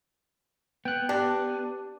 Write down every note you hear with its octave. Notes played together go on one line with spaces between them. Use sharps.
B3 G5 F#6
D4 G4 D5 A5